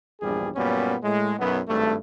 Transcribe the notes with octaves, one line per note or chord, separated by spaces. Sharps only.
A#1 E2 G2 G3 G#4
F#2 A#2 G3 B3 C#4
A2 G#3
B1 F#2 F#3 B3
G#1 G2 A3